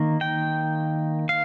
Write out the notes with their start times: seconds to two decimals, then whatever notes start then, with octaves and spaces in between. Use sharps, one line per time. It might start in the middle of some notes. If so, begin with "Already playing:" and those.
Already playing: D#3 A#3
0.21 G5
1.29 F5